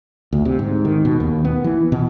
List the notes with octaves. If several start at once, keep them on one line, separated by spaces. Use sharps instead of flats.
D2
C3
G#2
D#3
B2
D#2
B3
E3
B2